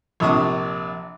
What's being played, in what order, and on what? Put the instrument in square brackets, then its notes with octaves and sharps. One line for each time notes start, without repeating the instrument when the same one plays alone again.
[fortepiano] A#1 C3 D4 C#6 D#6